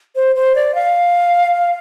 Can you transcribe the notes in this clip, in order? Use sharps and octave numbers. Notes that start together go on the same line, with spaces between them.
C5
C5
D5
F5